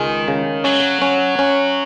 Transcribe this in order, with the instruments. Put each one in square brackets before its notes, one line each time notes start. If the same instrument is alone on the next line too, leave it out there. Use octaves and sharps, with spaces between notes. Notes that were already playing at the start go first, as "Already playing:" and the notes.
Already playing: [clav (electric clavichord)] C#2 G#3 [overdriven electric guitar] D#3
[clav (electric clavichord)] C#3
[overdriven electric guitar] F#3 [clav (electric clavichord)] C#4
[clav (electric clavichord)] C#4
C#4